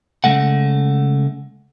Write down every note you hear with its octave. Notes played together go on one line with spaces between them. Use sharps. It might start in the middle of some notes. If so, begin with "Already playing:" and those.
C#3 G#3 A3 F#5